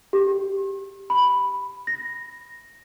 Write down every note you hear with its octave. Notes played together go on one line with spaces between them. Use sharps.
G4
B5
A#6